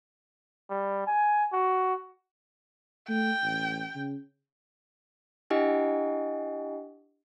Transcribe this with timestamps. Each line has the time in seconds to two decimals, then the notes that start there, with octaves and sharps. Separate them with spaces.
0.70 G3
1.07 G#5
1.53 F#4
3.09 A3 G5
3.43 A1
3.95 C#3
5.50 D4 E4 G4 D#5 F#5 G#5